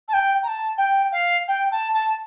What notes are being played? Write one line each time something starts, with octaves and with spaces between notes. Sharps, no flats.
A5
G5
A#5
A5
G5
F5
G5
A5
A5